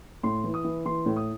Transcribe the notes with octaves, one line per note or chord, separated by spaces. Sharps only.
A2 C6
E3
D#6
E3
E3 C6
A2
D#6